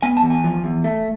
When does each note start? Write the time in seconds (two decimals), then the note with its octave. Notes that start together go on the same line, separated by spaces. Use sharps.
0.03 B3 G#5
0.17 A5
0.23 E2
0.30 G#5
0.44 F3
0.64 E2
0.84 A3